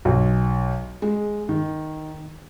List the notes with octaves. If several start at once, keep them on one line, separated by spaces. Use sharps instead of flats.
B1
G#3
D#3